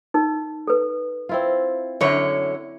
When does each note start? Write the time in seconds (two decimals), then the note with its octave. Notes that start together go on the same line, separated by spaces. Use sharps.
0.14 D#4 A#4
0.67 A4 B4
1.29 C4 E4 F4
2.01 F#2 D3 E4 C#5